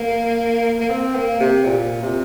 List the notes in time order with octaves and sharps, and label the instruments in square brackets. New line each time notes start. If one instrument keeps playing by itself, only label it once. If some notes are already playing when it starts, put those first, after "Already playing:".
Already playing: [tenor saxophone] A#3
A#3
C4
A#3
C3
A#2
C3